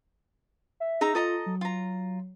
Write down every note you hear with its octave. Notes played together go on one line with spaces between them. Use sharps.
E5
D#4 G#4 E5 A#5
F4 A4 D#5 A#5
F#3
F4 A#5